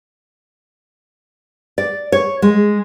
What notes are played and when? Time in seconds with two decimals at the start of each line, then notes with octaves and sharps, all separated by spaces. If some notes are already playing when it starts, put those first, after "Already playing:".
1.78 D5
2.12 C#5
2.42 G#3